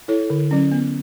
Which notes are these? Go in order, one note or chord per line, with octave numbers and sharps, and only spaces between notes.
E4 A4 C#5
D3
F#3 C#4
B3